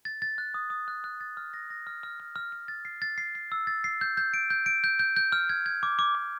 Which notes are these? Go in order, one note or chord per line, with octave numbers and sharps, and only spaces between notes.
A6
A6
F#6
D#6
D#6
F#6
F#6
A6
F6
A#6
A#6
F6
F6
F6
F6
F6
A6
C7
A6
C7
C7
E6
A6
C7
G6
G6
D7
G6
D7
G6
G6
G6
F6
G#6
G#6
D6
D6
D6